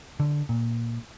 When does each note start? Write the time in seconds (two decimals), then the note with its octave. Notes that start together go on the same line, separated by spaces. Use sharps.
0.20 D3
0.49 A#2